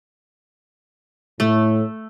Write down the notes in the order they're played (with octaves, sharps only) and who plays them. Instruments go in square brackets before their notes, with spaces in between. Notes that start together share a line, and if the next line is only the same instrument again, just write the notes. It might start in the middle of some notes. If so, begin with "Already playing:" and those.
[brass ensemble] A2 [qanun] A3